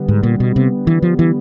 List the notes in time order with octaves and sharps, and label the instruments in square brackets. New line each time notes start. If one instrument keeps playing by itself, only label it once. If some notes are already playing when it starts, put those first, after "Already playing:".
Already playing: [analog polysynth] D3 G3 B3
[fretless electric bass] G#2
A#2
B2
C3
E3
F3
E3